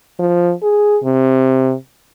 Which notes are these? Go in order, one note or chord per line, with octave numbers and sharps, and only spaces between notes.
F3
G#4
C3